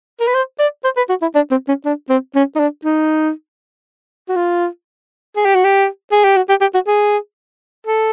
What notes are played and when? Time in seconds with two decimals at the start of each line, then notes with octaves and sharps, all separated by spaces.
0.20 A#4
0.27 B4
0.34 C5
0.59 D5
0.84 C5
0.97 B4
1.09 F#4
1.22 E4
1.35 D4
1.51 C4
1.68 C#4
1.85 D4
2.09 C4
2.35 C#4
2.55 D#4
2.59 D4
2.85 D#4
4.29 F#4
4.36 F4
5.36 G#4
5.45 G4
5.55 F#4
5.64 G4
6.12 G#4
6.24 G4
6.36 F#4
6.49 G4
6.61 G4
6.74 F#4
6.87 G#4
7.87 A4